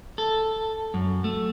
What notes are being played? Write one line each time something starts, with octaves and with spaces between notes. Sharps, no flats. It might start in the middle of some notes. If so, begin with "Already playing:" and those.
A4
F#2
A3